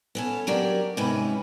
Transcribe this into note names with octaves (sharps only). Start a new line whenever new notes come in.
B3 C#4 A4
F#3 D4 G4 A#4 D5
G#2 C3 C#4 B4